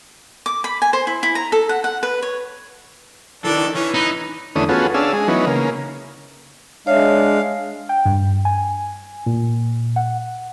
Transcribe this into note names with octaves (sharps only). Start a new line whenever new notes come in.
D6
B5
G#5
C5
E4
E4
A#5
A4
F#5
F#5
B4
C#5
D#3 E3 D4 A4
E3 C#4
D#4 B4
E2 D3 A3 C#4 D#6
B3 C#4 F4 F#4 G#4 A4
C#4 D4 G#4 F5 A5 E6
G#3 G#4
E3 F#3 B3 C#4 D#4
C#3 A#3
G#3 D4 C#5 E5 F5
G5
G2
G#5
A#2
F#5